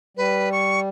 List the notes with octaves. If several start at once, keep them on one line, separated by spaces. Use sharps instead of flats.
G3 B4
C#6